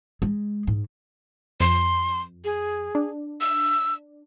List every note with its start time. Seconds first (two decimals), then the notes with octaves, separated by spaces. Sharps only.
0.22 G#3
0.67 G#2
1.60 F2 C6
2.44 G#4
2.95 D4
3.41 E6